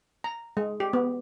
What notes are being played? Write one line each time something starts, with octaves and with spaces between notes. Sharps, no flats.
A#5
G#3
G4
B3